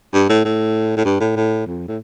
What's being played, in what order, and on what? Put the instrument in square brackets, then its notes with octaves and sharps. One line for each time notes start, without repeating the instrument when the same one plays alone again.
[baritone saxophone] G2
A2
A2
A2
G2
A2
A2
F2
A2